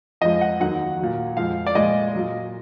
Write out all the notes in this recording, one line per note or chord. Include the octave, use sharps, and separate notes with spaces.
F2 F3 G#3 D#5
F#5
D#2 D#3 F#3 F#5
A#2 F#3
F2 F3 G#3 F5
D5
A#2 F3 G#3 D#5
A#2 F#3